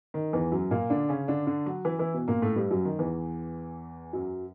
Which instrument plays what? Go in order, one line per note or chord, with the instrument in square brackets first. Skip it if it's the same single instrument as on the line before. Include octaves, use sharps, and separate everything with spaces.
[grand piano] D#3
E2 E3
F#2 F#3
A#2 A#3
D3 D4
C#3 C#4
D3 D4
D3 D4
F#3 F#4
E3 E4
E3 E4
B2 B3
A#2 A#3
A2 A3
G2 G3
F#2 F#3
D#3
E2 E3
F#2 F#3